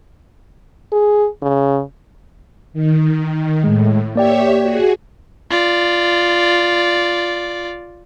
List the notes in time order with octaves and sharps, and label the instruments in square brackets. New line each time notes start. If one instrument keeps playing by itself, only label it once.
[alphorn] G#4
C#3
[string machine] D#3
[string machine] A2 [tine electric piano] G#3
[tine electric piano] A#3 D5 G5 [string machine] G4 C#5 E5
[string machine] F#4 G#4
[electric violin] F4 D5